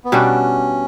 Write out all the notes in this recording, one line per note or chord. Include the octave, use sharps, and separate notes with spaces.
B3
B2 G3 C#4 D4 F#4